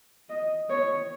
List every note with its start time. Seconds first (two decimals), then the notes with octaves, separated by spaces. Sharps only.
0.29 D#5
0.70 C#5